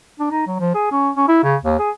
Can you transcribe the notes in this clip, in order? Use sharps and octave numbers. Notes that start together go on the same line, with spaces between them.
D4
D#4
F#3
F3
G#4
C#4
C#4
E4
C#3
D#2
G#4